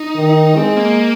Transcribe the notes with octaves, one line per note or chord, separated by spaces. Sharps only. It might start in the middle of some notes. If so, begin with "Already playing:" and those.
Already playing: D#4
D#3
G#3 C4
A#3